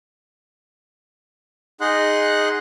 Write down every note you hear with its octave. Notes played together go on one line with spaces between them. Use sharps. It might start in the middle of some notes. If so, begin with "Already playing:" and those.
D#4 G#4 D#5 F#5 C6 F#6